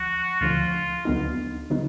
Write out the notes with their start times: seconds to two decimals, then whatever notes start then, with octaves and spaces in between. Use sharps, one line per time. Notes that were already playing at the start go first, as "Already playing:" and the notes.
Already playing: D2 F3 F#4
0.41 D2 D3 F3 F4
1.05 D2 D3 F#3 B3 D#4
1.70 D3 F#3 B3 D#4